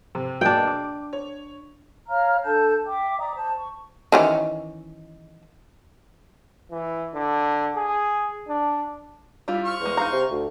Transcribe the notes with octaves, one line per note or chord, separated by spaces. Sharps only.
C3
B2 A#3 D4 G#4 G5
D6
C#5
C#5 F5 A#5 F6
D4 A4 A5 G6
E5 G5 D6
D5 A#5 D#6
C5 A5
C#6
D#3 E3 C#4
E3
D3
G#4
D4
G3 E4 F4
C5 C#6 F6
E2 G#3 A#4
D#4 F5 A#5
C3
D2